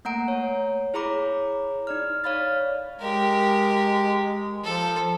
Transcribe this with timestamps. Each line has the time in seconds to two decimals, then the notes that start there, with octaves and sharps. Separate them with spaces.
0.05 A3 A#3 F#5 A#5 D7
0.28 C#5
0.94 E4 G#4 C#5 A#5 B5 D6
1.87 D#4 D5 F6
2.24 C#5 D5 F5 B5 F6 A6
3.00 G#3 G4 A#4
4.64 F3 A4